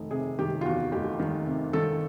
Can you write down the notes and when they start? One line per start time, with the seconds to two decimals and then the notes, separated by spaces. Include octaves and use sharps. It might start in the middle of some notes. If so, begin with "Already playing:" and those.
Already playing: F1 D#3
0.11 C3 G#4
0.39 D#3 G4
0.61 F4
0.65 E2 F#4
0.92 F1 G4
1.19 D#3
1.46 C3
1.73 D#3 A4